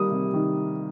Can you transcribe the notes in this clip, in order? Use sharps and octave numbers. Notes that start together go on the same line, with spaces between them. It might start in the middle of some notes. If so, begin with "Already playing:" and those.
Already playing: D#3 G3 A#3 D#6
C3
D#3